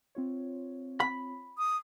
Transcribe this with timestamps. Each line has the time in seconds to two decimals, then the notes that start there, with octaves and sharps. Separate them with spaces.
0.15 C4 F4 C#5
1.00 B5
1.58 D#6